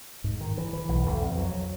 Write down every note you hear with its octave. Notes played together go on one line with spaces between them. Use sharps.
G#2
D#3
E3
E3
B1
B1
F2
F#3